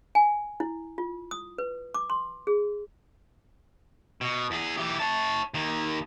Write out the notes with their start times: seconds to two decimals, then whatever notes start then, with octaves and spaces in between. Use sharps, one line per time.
0.15 G#5
0.60 E4
0.98 F4
1.31 D#6
1.58 B4
1.94 D6
2.10 C6
2.47 G#4
4.21 B2
4.51 E2 G#4
4.77 E3 G4
5.00 C#5 A5
5.54 D#2 D#3